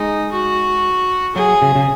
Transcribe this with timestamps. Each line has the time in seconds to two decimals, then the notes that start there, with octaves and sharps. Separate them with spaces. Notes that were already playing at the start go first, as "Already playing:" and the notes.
Already playing: G#3 D#4
0.32 F#4
1.35 F#3 G#4
1.62 C#3
1.76 C#3